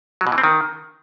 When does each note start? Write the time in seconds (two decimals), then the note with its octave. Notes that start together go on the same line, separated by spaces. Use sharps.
0.21 F#3
0.27 B2
0.32 E3
0.38 C4
0.44 D#3